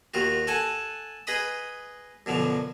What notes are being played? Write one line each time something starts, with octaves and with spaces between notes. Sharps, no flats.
D#2 D#3 F4 F#4
A4 F#5 G#5 A5
G#4 B4 D#5 B5 D#6
F#2 B2 D3 F3